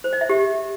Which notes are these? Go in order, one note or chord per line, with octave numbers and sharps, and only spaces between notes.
C5
D5
E5
G4